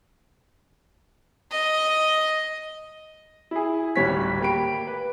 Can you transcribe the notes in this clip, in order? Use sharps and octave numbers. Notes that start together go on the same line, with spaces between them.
D#5
E4 G#4
D1 G#1 G3 C#5 B6
A#3 G4 B5 D7
B4